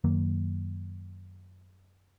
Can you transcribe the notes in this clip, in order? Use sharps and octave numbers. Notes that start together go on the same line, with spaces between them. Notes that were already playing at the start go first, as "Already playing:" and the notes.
F#2 D#3 F#3 A#3